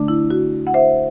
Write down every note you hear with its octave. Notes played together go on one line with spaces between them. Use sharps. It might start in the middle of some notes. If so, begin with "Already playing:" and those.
Already playing: D3 A3 D4
E4
F#4
F#5
C5 E5